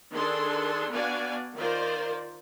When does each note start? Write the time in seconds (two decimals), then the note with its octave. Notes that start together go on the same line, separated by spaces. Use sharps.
0.13 D#3 D4 G#4 A4 C6
0.92 B3 D4 F#4 D5 F5 G#5
1.57 D#3 F4 A#4 C5 D5